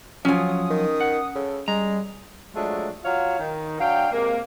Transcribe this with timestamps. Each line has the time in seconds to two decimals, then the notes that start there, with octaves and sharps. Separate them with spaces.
0.25 F3 F#3 C#4 F4 G#5 D#6
0.70 D#3
1.01 F#5
1.35 C#3 A4
1.68 G3 G#3 A#5
2.54 F3 F#3 G#3 A3 D4
3.04 F#3 F4 C#5 F5
3.39 D#3
3.80 F#3 D4 F5 G5
4.12 C3 G#3 A#3